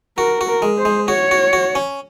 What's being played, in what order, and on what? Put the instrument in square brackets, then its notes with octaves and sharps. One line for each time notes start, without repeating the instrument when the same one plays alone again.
[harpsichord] F#4 [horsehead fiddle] A#4
[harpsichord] F#4
[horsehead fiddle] A#4
[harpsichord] G#3
[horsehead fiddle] C5
[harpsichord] G#3
[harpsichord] F#4 [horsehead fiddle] C#5
[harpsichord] F#4
F#4
C#4